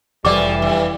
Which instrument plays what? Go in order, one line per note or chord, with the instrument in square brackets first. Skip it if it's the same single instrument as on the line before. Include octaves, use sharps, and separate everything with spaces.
[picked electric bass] F1 [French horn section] E3 G3 [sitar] F3 A4 [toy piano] D5 D6
[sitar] G2